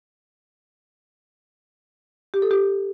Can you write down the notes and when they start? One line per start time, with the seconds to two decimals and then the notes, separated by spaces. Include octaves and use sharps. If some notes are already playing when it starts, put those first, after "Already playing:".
2.34 G4
2.42 A4
2.51 G4